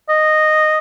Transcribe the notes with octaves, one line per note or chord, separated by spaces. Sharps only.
D#5